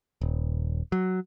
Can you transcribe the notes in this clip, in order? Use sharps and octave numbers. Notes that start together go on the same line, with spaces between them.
D#1
F#3